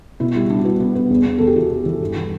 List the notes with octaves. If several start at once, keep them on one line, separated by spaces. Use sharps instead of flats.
B2 E4
G3 E4
G3 D4
F#4
B3 E4
B3
B3
E2
E2
E2 A4
G4
E3 F#4
E2
E3
G2
E3